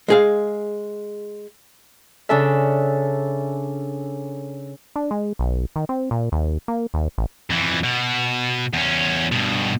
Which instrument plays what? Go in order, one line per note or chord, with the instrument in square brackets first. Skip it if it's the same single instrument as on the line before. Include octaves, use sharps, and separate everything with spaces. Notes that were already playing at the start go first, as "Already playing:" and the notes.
[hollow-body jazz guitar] G#3 G#4 F5
[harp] C#3 D4 A4 E5
[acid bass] D4
G#3
B1
D#3
C4
A#2
D#2
A#3
D#2
A1
[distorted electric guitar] F2 E3
B2
E2 C#4
G2 B2